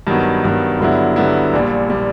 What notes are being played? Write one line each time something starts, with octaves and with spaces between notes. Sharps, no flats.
G2 D#3 F#3 B3
G2 D#3 F#3 B3
G2 D3 F#3 B3 E4
G2 D3 F#3 B3 E4
A#1 A#2 G3
A#2 G3